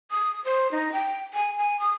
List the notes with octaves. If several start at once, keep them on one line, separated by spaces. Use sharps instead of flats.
D#6
C5
D#4
G5
G#5
G#5
D#6